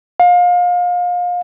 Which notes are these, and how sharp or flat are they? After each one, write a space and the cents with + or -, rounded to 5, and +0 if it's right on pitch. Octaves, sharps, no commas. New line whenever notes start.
F5 +30